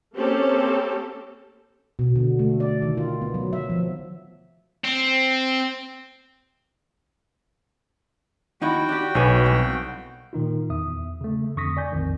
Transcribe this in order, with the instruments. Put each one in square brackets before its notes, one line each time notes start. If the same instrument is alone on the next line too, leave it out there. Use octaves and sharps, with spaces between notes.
[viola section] A#3 C4 C#4 G4 A4
[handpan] B2
D3
A3
D5
D#3
F4
B3
F#3
E5
F3
[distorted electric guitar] C4
[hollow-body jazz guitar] D#2 D#4 E4 [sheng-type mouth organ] F#4 G5
[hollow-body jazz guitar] D4 G4
[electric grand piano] B1 B4 [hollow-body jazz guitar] C#5 G#5
[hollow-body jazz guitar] C2
[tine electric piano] A#2 D#3 D#4 F4
E2 E5 D#6
C#3 A3
F2 D3 C#6 D#6 A#6 B6
D5 G#5 G6
A#1 F2 D#3